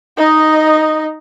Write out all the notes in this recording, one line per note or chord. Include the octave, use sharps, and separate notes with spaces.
D#4 D#5